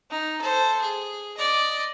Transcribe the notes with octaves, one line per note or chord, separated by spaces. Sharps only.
D#4
A4 C5
G#4
D5 D#5